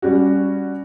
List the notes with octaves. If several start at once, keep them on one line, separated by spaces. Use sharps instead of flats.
G3 C#4 F#4